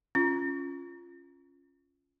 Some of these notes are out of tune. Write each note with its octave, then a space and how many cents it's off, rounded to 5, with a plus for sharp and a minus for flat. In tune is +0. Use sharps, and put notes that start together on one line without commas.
C#4 +0 F4 -5